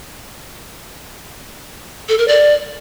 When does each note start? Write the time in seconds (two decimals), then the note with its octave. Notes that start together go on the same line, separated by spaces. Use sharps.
2.09 A4
2.18 A#4
2.28 D5